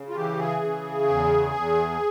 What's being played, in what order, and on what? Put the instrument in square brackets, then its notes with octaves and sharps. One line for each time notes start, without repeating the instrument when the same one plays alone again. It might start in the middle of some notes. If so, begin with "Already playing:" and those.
Already playing: [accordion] C#3
F4
E3 G4
G#4
C#3
E2
E2